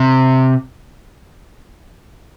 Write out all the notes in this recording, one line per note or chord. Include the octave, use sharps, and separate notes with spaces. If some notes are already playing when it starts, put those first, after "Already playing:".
Already playing: C3